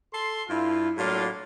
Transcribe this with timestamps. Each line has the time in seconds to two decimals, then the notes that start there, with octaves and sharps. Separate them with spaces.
0.13 A4 C6
0.48 G2 E4 F4
0.98 A2 F#3 A#3 D4 F4